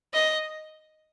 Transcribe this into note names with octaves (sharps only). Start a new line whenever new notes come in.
D#5